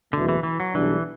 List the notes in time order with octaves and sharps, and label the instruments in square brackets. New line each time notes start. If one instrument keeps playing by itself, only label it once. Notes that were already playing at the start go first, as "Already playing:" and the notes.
[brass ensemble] F#1 E2 B2 A3 [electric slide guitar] D3
[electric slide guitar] E3
E3
F#3
[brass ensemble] B1 B2 G3 D4 [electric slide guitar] E3